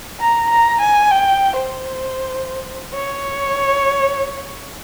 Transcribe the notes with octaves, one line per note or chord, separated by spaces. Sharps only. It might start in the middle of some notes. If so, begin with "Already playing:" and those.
A#5
A#5
G#5
G5
C5
C#5